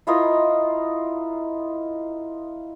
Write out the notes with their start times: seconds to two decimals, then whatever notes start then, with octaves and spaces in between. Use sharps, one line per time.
0.07 E4 F4 A#4 D#5